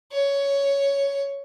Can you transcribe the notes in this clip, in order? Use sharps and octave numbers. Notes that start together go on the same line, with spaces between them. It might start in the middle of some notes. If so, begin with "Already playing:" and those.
C#5